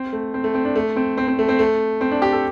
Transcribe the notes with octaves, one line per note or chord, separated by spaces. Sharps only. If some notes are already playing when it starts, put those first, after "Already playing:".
Already playing: C4
A3
C4
A3
C4
D4
A3
C4
C4
C4
A3
C4
A3
C4
D4
G4
A4